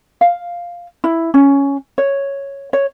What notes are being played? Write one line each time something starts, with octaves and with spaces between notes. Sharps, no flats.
F5
E4
C#4
C#5
C#5